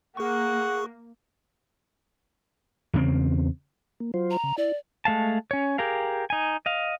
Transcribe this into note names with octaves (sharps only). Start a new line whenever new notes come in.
A#3 G#4 F#5 C#6
E2 C#3 B3 C4
A#3
F#3 F4 C5
A#5
C#3
E4 D5
G#3 A3 F5 A5
C#4 C#5
G4 G#4 A#4 F5
D#4 G#5
D#5 F5